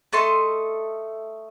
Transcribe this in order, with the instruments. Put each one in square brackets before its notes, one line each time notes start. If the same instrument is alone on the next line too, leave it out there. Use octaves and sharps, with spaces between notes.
[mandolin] A3 A4 D#5 C6